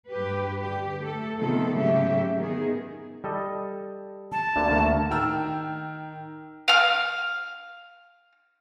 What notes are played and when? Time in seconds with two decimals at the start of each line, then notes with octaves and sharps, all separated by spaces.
0.10 G2 G4 B4
0.59 D3 G4
1.01 A3 A4
1.38 C3 D#3 F3 B3 A4
1.74 G#2 C#3 F#3 A3 G4 E5
2.38 D#3 B3 G#4
3.24 G3 A4 D#5
4.32 A5
4.56 D2 D3 A#3
4.70 D2 A3 A#3
5.11 D#3 G5 A#5 E6 F6
6.68 F5 F6